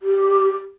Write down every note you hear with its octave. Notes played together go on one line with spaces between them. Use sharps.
G4